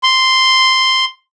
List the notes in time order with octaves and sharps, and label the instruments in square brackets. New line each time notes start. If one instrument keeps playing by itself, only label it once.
[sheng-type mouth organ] C6